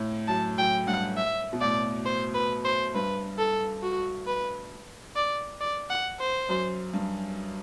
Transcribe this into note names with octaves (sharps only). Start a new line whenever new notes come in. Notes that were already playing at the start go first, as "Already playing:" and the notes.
Already playing: A2
F#2 A5
F#2 G5
G2 F#5
E5
B2
A2 D5
C5
B4
C5
G2 B4
A4
F#4
B4
D5
D5
F#5
C5
F#2
G2